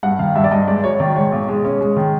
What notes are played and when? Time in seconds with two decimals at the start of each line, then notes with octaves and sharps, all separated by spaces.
0.03 G2 F#5
0.19 D#3 F5
0.35 G2 E5
0.44 D5
0.51 G2 D#5
0.67 G#2 D5
0.83 F#3 C#5
1.00 D#3 D5
1.16 G#2 C#5
1.32 B1
1.48 G#3
1.65 C#4
1.81 G#3
1.97 D#3